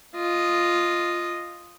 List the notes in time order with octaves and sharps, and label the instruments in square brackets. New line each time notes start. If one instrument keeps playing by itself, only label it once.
[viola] F4 D#5